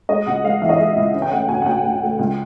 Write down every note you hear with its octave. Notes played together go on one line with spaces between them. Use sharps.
G#3 D#5
C#2 F#5
G#3 F5
E3 E5
D#5
G#3 E5
C#2
C#3
G5
A3 F#5
D2 G#5
F#5
D2 G5
D2
A3
C#2